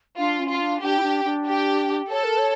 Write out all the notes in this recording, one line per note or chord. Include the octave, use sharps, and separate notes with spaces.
D4 F4
C#4
F4
D4
D4 G4
E4
D4
D4
G4
A4 C#5
A#4
C#5